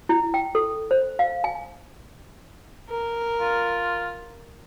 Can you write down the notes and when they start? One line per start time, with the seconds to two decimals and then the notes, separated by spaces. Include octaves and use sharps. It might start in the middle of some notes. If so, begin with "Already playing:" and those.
0.09 E4
0.34 G5
0.55 A4
0.91 C5
1.19 F5
1.44 G#5
2.90 A#4
3.41 F4